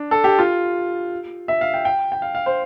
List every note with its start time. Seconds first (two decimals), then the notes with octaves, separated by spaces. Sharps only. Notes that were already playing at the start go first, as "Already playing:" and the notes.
Already playing: D4
0.11 A4
0.24 G4
0.39 F4
1.48 E5
1.61 F5
1.74 G5
1.85 G5
2.12 G5
2.22 F5
2.35 F5
2.46 C5